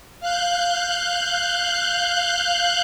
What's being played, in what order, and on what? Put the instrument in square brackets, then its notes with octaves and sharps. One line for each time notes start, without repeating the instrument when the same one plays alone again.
[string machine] F5 F#6 G6